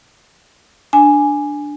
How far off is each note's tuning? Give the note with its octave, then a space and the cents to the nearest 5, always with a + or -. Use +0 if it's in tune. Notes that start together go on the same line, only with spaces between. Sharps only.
D4 +0 G#5 +0